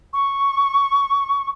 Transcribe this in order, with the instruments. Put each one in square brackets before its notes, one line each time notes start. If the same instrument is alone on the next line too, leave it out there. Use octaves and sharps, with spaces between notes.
[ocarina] C#6